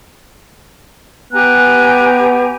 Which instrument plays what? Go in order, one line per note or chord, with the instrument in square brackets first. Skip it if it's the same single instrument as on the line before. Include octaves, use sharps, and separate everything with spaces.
[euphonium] B3 [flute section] G4 G#5 A#5 [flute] F#6